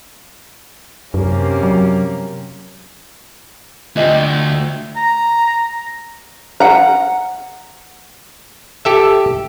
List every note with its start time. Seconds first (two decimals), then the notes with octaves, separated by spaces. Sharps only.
1.14 F#2 C3 A#3 C#4
1.63 F#3
3.96 D2 F4 D#5 G5
4.96 A#5
6.60 F#5 A#5
8.85 G4 A4 E5